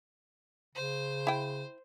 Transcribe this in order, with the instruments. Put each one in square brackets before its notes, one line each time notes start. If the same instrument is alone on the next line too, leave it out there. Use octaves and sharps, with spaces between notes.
[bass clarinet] C#3 [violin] C5
[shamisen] E4 G5